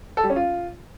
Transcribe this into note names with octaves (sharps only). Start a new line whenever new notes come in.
A4
G3
C#4
F4